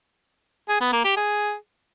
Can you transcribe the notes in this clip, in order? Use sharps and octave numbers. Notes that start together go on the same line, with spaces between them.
G#4
B3
A#3
G4
G#4